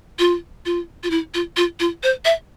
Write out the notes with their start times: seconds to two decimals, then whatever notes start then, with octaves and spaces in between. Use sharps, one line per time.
0.19 F4
0.66 F4
1.03 F4
1.11 E4
1.34 F4
1.57 F4
1.80 F4
2.03 C5
2.25 E5